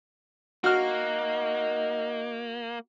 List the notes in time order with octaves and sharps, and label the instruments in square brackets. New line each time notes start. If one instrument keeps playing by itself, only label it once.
[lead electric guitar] A#3 [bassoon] D#4 [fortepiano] F#4 F6